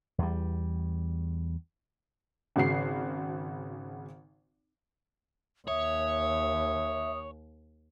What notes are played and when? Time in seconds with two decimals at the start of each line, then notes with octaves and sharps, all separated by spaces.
0.18 E2 G3
2.56 G#1 C#3 F#4 C7
5.68 D#2 C#5 E5 D#6